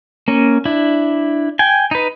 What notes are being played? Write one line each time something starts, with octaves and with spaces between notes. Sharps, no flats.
A#3 C#4
D4 E4
G5 G#5
D#4 B4